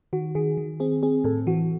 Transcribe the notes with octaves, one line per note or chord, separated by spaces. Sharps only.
D#3 F#4
D#3 G#4
D#3
C4 G#4
C4 G#4
A2 A4
E3 F#4